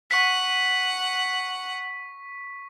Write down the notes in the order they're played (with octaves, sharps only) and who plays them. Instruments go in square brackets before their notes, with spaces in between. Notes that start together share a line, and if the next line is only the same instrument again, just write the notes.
[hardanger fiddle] F#5 [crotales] C#6 B6